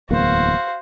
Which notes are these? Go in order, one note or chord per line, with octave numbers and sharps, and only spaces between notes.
D1 E2 A#3 F#4 C5 F5